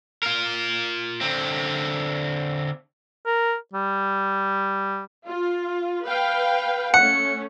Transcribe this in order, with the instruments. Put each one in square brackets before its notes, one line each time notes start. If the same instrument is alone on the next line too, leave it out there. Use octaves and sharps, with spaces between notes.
[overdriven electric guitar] F4 A#4
D3 C4
[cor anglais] A#4
G3
[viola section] F4
B4 F5 G5
[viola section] A3 C#4 [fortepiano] F#5 [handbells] C#7